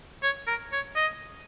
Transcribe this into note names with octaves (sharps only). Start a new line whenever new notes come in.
C#5
A#4
C#5
D#5